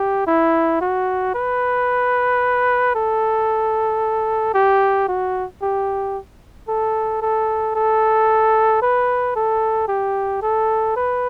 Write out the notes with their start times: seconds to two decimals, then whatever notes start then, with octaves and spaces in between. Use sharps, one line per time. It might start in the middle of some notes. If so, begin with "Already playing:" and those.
Already playing: G4
0.27 E4
0.81 F#4
1.35 B4
2.95 A4
4.54 G4
5.08 F#4
5.62 G4
6.69 A4
7.22 A4
7.75 A4
8.82 B4
9.36 A4
9.88 G4
10.42 A4
10.96 B4